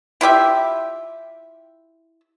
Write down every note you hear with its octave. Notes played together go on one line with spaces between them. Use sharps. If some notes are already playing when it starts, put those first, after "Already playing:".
E4 F4 G4 E5